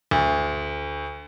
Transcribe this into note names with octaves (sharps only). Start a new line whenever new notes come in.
D2